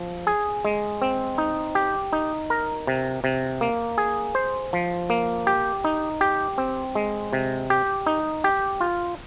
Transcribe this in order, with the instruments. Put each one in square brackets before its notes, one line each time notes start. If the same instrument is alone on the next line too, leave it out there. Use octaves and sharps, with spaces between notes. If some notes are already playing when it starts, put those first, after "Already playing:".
Already playing: [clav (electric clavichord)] F3
G#4
G#3
C4
D#4
G4
D#4
A#4
C3
C3
A#3
G#4
C5
F3
A#3
G4
D#4
G4
C4
G#3
C3
G4
D#4
G4
F4